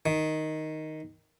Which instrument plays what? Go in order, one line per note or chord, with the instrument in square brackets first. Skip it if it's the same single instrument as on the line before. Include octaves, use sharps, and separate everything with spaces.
[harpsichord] D#3